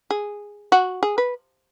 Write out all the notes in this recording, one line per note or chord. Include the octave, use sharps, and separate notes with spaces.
G#4
F#4
G#4
B4